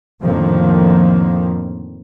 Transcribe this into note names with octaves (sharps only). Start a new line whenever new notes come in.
F2 A2 D3 D#3 F3 A#3